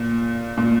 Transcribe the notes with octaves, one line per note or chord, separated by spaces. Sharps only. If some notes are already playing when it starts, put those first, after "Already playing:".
Already playing: A#2
A#2